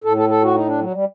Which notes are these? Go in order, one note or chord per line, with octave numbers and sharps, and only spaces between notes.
A2 A4
A4
A4
F#4
D#4
D4
F#3
G3